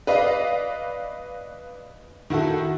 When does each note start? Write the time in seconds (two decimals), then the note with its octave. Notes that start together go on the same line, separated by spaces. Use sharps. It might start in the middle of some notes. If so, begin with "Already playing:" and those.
0.07 B4 D5 D#5 F5
2.30 D#3 E4 F#4 A4